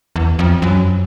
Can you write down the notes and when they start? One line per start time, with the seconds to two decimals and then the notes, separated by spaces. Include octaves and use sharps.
0.16 E2
0.39 F2
0.62 F#2